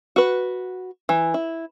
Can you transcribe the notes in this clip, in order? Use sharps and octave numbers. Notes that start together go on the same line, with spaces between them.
F#4 B4
E3
E4